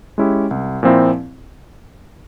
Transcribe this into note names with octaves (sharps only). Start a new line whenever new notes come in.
G#3 C#4 E4 G4
C2
A#2 F3 C4 E4